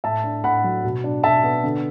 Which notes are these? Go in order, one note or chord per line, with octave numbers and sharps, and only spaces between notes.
A2 E5 A5
D4
A2 F#5 B5
F#3
B2
D4
B2 E5 A5
B3
D3